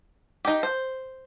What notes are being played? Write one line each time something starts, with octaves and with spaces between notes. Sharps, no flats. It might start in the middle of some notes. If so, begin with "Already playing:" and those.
D#4 G4
C5